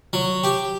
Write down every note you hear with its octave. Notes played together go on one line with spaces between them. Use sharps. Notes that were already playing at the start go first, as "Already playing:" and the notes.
F#3
G4